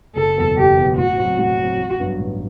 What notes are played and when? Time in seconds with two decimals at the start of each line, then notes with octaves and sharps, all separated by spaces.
0.16 F#1 A4
0.37 E2 B2 F#3 B3
0.57 F#1 G4
0.77 E2 B2 F#3 B3
0.97 A2 F#4
1.17 F#3 C4
1.38 A2 F#4
1.58 F#3
1.63 C4
1.79 A1
2.00 G2 F#3 B3
2.19 A1